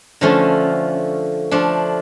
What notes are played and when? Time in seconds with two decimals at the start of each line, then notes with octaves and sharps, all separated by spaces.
0.21 D3 F3 A3 C#4
1.51 F3 A3 D4